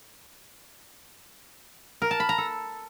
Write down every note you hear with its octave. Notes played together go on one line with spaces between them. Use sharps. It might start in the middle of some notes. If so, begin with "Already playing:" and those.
A#4
A5
B5
A#5
A4